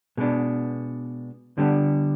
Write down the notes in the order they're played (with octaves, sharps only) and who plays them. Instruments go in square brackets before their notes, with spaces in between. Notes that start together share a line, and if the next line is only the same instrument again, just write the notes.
[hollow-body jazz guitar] B2 G#3 B3 D4
D3 G3 B3 D4